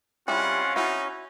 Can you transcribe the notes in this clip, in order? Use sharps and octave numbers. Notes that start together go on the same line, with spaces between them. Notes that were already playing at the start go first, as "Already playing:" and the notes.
G3 G#3 C4 C#4 E4 F4 F#5
D#4 E4 F#4